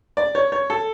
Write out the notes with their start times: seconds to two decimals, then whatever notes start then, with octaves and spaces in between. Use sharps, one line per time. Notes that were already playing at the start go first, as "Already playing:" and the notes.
0.17 D5
0.35 C#5
0.52 C#5
0.70 A4